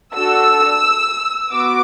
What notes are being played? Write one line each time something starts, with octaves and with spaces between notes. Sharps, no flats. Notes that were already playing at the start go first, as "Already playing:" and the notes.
D4 F#4 A4 E6
B3 F#4 D6